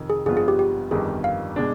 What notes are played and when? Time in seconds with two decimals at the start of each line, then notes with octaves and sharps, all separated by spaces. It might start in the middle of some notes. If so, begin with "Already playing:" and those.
Already playing: F2 C3 D#3
0.10 G#4
0.26 G#1 G2 F3 B3 F4 G#4
0.37 G#4
0.48 G4
0.59 G4
0.91 G1 F2 D#3 G3 G#4
1.24 F5
1.56 B2 G#3 D4